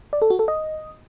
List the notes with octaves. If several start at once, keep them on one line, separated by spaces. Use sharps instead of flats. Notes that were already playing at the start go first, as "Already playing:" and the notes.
D5
A4
F#4
A4
D#5